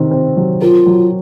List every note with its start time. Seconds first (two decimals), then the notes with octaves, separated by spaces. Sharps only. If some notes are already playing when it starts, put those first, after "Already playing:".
Already playing: C3 D#3 C4
0.11 C4
0.37 F#3
0.62 F4 A#4
0.86 F#3